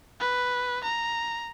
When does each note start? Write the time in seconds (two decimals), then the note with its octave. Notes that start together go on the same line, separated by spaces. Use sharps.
0.20 B4
0.84 A#5